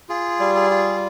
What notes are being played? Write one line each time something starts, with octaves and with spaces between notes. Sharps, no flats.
F4 G#4
G3
G#4
F4